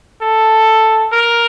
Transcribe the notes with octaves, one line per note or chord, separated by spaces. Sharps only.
A4
A#4